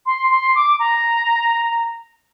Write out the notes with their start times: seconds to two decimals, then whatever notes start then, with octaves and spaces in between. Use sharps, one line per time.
0.06 C6
0.30 C6
0.55 D6
0.79 A#5